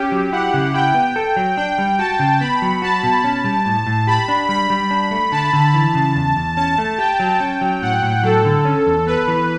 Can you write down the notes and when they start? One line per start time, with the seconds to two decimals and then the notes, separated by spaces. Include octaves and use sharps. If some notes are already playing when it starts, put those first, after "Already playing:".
Already playing: C#4 G4
0.12 F#3
0.32 E4 F#5
0.54 C#3
0.74 E4 G5
0.95 B3
1.16 A4
1.37 F#3
1.57 D4 G5
1.78 G3
1.99 F#4 A5
2.19 C#3
2.40 B3 B5
2.62 F#3
2.82 F#4 A5
3.03 B2
3.24 C#4
3.44 G3
3.66 A2
3.87 A2
4.07 G4 B5
4.28 D4
4.49 G3 B5
4.70 G3
4.91 D4
5.11 A3
5.32 D3 A5
5.53 D3
5.74 E3
5.95 C#3
6.16 E2
6.36 E2
6.57 C#4 A5
6.78 A3
6.98 G4 G5
7.20 F#3
7.40 C#4
7.61 F#3
7.82 A2 F#5
8.03 A2
8.23 F#3 A4
8.45 D3
8.65 C#4
8.87 E2
9.07 B3 B4
9.28 E3